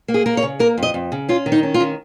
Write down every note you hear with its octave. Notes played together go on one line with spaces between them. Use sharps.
A#3
G#4
A#3 A#4
C#5
C#3
A#3 A#4
F2
D#5
F2
C#3
C#4 F4
D#3
D#4
C#4
F4
D#3